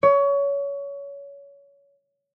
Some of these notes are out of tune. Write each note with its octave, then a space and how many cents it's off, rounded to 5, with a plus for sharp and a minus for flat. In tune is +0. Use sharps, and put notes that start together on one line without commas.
C#5 +25